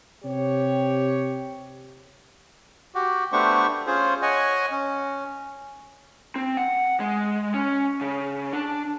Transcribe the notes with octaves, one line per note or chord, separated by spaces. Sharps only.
C3 G4 C#5
F#4 G4
A3 B3 D4 G4 C5 C#6
C#4 F4 G#4 C5
C#5 D#5 F#5 G#5
C#4
C4
F#5
G#3
C#4
C#3
D4